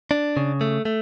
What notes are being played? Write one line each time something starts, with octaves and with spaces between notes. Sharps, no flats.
D4
C#3
A3
A3